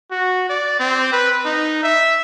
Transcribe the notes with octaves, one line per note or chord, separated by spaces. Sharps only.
F#4
D5
C4
B4
D#4
E5